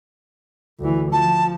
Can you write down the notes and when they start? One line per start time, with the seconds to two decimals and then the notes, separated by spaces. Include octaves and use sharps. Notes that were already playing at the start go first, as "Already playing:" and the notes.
0.80 D2 E3
1.12 F3 A5